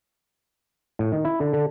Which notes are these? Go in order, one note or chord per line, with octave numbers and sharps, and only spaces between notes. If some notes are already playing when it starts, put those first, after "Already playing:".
A2
D#3
E4
D3
D3